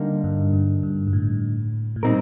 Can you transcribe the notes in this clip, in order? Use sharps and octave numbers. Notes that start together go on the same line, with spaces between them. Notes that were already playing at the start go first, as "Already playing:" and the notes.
Already playing: D3 G3 A#3 D#4
G2
G2
G2
G2
A2
A2
A#2 G3 C4 D#4 A#4